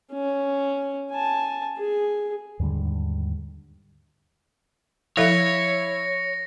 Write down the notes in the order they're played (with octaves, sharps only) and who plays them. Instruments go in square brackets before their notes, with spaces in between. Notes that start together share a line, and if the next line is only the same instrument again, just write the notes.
[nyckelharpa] C#4
G#5 A5
G#4
[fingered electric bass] D#2 G#2 D3 G3
[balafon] F3 A4 F5 [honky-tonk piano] E4 [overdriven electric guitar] C#5 [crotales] A#6 C#7